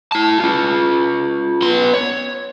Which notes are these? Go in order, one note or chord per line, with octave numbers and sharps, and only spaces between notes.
E4 A5
C#4 F4
B3 C6
C#5